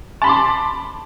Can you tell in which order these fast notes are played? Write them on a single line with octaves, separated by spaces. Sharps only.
A5 B5 C6 D6